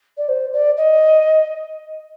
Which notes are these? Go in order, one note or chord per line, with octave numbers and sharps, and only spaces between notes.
D5
C5
D5
D#5